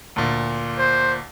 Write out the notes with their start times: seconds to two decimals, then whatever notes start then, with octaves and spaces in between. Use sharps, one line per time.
0.16 D2 A#2
0.79 C5